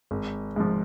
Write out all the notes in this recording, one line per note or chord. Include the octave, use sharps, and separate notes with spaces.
G#1
G#2 F3